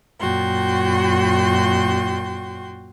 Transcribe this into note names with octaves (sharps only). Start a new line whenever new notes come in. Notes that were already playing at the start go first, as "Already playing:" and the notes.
F#2 A#2 F#4 G5 C6